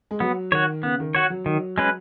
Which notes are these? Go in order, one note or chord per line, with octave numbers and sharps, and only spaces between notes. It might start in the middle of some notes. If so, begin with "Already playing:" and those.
G#3
F#3 B3
D#3 F#4 C#5
C#3 B3
D#3
F#4 C#5
F#3
D#3 F#3
G#3 C#4 B4